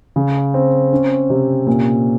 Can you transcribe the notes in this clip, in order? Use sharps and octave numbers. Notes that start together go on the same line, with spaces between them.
C#3
C4
C#4
C3
A#2